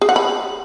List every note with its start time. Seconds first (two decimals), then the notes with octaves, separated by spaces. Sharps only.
0.01 G#4
0.09 F#5
0.16 B5